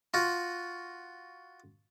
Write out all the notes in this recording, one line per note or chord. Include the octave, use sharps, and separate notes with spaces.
F4 F#4